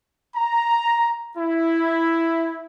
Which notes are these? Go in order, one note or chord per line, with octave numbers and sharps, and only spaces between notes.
A#5
E4